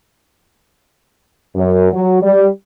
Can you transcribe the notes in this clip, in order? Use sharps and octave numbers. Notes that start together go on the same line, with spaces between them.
F#2
F#3
G3